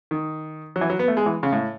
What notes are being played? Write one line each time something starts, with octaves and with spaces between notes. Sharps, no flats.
D#3
F#3
E3
F#3
B3
A3
G#3
E3
C#3
A2